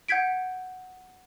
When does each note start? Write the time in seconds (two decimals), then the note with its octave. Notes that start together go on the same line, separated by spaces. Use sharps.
0.08 F#5 G6 G#6 B6 D7